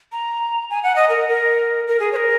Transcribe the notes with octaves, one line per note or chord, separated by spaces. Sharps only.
A#5
G#5
F#5
D#5
A#4
A#4
A#4
G#4
C#5
A#4